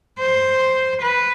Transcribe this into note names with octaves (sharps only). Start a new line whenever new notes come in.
C5
B4